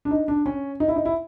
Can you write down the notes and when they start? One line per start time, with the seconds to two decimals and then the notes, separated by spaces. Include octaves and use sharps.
0.05 D4
0.11 D#4
0.28 D4
0.46 C#4
0.80 D#4
0.88 E4
0.96 D#4
1.05 E4